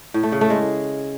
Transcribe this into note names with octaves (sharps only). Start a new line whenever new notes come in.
A2
A3
C#3
A3
G#3